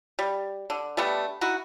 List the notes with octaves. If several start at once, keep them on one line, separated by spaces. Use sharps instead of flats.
G3
D3
G3 A3 B3 D4
D#4 E4 F#4